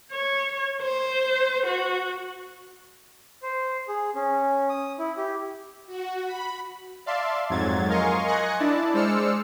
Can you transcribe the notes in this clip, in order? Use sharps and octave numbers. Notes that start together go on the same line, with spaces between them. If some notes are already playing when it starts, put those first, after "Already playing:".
C#5
C5
F#4
C5
G#4
C#4
D#6
E4
G4
F#4
B5
D5 E5 F5 A5 C6
F2 G#2 F#3 G#6 A6
A#4 D#5 F5 G#5 C6 C#6
D#5 G#5 F#6 G#6 A#6 C#7
D4 E4 D5 A5
G#3 C5 D5 E6 F6 C#7